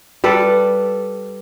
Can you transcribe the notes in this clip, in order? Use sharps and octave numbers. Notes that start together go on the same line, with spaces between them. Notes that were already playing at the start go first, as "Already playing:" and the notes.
G3 A4 B4